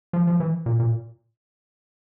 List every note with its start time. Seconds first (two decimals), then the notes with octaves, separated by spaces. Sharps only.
0.13 F3
0.27 F3
0.40 E3
0.66 A#2
0.80 A#2